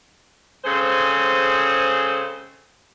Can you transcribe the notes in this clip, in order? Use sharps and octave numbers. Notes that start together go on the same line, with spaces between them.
C#3 G#3 C4 G#4 A4 C5